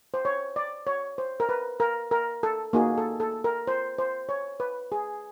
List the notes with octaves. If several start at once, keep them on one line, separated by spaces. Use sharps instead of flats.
C5
C#5
D5
C#5
C5
A#4
B4
A#4
A#4
A4
A#3 D#4 F#4 G#4
A4
A4
A#4
C5
C5
C#5
B4
G#4